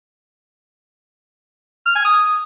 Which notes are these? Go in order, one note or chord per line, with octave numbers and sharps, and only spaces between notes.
F6
G#5
D#6